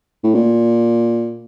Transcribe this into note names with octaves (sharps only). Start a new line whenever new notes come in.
A2
A#2